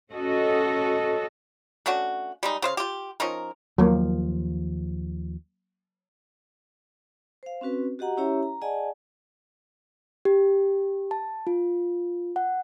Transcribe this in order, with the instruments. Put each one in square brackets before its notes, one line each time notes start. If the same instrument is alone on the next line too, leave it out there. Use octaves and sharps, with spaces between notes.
[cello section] C#4 F#4 A4 D#5
[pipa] A3 C#4 D4 F#4
G3 G#3 D#4
C#3 C5 F5
F4 G4
F3 C#4 D#4 A#4
[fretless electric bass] D#2 F3 [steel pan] F#3 A#3
[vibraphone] C5 F5
C4 C#4 F#4 B4
F#4 G4 D#5 F#5 A#5
C#4 E4 G4 C#5 E5 A#5
A#5
G#4 D5 D#5 F#5 G#5 A5
[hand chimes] G4
A5
F4
F#5